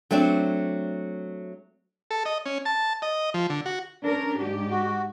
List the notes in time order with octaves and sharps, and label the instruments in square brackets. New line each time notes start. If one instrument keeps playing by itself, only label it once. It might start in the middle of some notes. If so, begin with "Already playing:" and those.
[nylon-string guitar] F#3 A3 C4 D4
[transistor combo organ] A4
D#5
C#4
A5
D#5
F3
D3
F#4
[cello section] C#4 D4 A#4
G#2 G4
[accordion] F#4